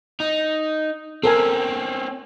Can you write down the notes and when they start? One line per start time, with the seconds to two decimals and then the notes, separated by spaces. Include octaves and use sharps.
0.20 D#4
1.24 C4 C#4 A4 A#4 G#5